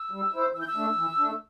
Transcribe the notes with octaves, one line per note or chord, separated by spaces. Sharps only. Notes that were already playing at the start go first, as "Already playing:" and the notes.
Already playing: E6
G3
E4 C5
E3 E6
G6
E6
A3 D4
E3
A3 D4